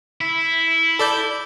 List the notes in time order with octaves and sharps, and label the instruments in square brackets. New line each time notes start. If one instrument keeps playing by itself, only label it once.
[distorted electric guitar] E4
[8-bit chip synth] A4 D5 G6